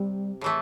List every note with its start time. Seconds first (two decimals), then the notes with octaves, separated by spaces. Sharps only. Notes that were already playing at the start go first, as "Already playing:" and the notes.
Already playing: C3 G3
0.41 A2 E3 A3